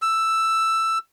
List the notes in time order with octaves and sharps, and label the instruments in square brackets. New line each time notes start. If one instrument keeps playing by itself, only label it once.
[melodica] E6